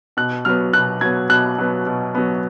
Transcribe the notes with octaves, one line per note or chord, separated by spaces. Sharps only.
B2 F#6
F#3 B3 F6
B2 F#6
F#3 B3 G#6
B2 F#6
F#3 B3
B2
F#3 B3